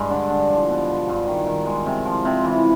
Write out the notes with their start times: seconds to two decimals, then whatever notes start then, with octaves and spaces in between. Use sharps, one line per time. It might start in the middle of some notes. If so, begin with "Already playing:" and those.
Already playing: G2 G#3
0.10 D3
0.30 D3
0.49 F3
0.69 B2
0.88 G#3
1.08 G2
1.27 D#3
1.47 D#3
1.66 G#3
1.86 C3
2.05 F3
2.25 C3
2.44 E3